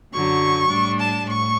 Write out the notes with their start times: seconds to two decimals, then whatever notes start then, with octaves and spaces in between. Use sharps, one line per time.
0.13 F#2 D3 F#3 C#6
0.70 A2 G3 D4
0.99 A5
1.27 A2 C#6